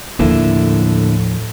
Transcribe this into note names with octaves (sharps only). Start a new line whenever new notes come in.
D#2 A2 D3 F3 A#3 E4